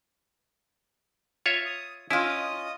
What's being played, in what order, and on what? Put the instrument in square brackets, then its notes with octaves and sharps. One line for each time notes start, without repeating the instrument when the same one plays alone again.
[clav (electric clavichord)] F4 C#5 E5
[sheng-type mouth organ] D#6
[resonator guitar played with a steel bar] C#4 F4 [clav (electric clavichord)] E4 [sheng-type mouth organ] D#5 D#6